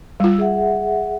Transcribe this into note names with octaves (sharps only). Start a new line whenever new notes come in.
G3 F4 E6
G#4 E5 F#5